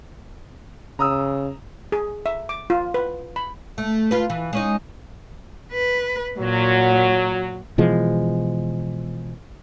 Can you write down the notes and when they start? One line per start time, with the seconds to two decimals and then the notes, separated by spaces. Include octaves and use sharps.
0.99 C#3 A#5 D#6 E6
1.92 G#4
2.26 E5
2.49 D6
2.70 F4
2.94 B4
3.36 B5
3.78 A3
4.11 F4 B4
4.30 E3
4.53 G#3 C#4 D#4
5.72 B4
6.38 A#2 F#3
7.78 B2 E3 F3 G#3